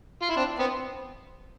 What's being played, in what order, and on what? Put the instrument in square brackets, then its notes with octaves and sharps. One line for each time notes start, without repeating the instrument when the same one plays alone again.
[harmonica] F4
E4
[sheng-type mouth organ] C4 [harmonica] D4
[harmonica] B3 [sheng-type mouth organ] C4